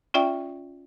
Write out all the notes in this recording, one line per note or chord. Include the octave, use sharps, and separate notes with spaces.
C#4 F4 D5 E5 G5